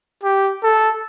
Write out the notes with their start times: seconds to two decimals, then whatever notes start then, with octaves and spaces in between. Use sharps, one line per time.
0.23 G4
0.63 A4